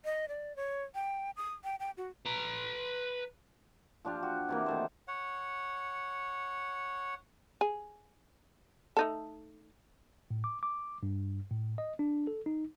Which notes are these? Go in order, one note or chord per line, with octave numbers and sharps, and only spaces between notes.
D#5
D5
C#5
G5
D#6
G5
G5
F#4
B4 A#5
F3 D4 F4 G4
F#4
C3 E3 A#3
D#3 A3 C5
C#5 F#5
G#4
A3 D#4 A4
A2
D6
D6
G2
A2
D#5
D4
A4
D#4